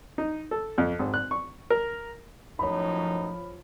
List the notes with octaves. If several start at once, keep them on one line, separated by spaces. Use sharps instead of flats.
D#4
A4
F2
G#1
F#6
C#6
A#4
F#2 A2 F3 D#4 C#5 B5